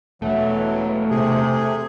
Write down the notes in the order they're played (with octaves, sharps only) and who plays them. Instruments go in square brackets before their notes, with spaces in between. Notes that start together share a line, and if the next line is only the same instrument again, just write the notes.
[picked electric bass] E1 [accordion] E3 F#3 [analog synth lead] A3
[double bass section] C3 [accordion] G#4